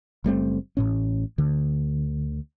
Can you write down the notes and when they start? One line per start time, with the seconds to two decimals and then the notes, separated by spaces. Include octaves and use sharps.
0.24 F#1 G3 A3 C4
0.77 A1 A2 C#4
1.38 D2 D3